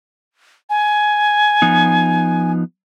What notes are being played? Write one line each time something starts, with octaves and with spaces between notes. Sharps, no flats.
G#5
F3 B3 D#4